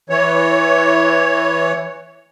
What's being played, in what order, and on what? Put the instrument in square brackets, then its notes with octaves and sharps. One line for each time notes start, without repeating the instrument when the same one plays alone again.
[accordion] E3 C#5